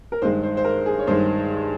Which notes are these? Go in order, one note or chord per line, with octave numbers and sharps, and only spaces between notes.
A#4
G2 D#3 G#3 C5
C5
C5
A#4
G#4
C#5
G2 D#3 G#3 C5